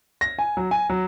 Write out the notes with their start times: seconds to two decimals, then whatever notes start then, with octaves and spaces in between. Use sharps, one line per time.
0.21 A#6
0.39 G#5
0.57 F#3
0.71 G#5
0.89 F#3